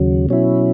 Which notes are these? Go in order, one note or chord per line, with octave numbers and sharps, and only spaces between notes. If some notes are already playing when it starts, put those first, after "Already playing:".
Already playing: D#2 C#3 F#3
B2 F#3 C#4 E4